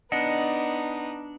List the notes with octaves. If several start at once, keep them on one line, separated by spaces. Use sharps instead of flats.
B3 D4 D#4 D#5 F#5